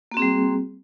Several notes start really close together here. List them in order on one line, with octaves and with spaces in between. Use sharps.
A#3 F#4 C4 G#4 G3